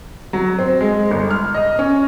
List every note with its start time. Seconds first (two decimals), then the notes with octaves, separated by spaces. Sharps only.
0.33 F#3
0.59 C4
0.81 G#3
1.11 G1
1.31 F6
1.54 D#5
1.79 C#4